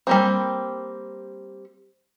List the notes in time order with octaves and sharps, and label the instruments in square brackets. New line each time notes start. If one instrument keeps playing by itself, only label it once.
[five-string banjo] G3 A#3 C4